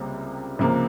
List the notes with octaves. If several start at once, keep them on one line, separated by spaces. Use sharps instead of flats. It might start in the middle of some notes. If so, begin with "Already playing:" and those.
Already playing: C#2 C3 G3 A#3
C#2 C3 F3 A#3